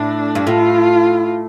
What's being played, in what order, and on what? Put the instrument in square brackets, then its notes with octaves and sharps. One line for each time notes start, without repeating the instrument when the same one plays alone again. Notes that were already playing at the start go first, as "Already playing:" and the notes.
Already playing: [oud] A2 [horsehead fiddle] D4
[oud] G2
[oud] A2 [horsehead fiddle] F4